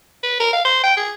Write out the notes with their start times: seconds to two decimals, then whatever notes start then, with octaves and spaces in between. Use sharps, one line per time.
0.23 B4
0.40 A#4
0.53 F5
0.65 C5
0.84 G5
0.97 G#4